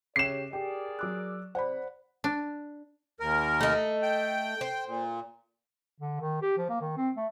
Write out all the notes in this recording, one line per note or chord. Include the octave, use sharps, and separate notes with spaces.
C#3 G4 C#5 E5 D6 C7 E7
G4 G#4 A#4 D5 G5
F#3 D6 E6 F#6
C3 C5 D5 F#5 B5
D4
D#2 A#4
A3 D#5
G5
C5
A#2
D3
D#3
G4
F3
A#3
D#3
C4
A3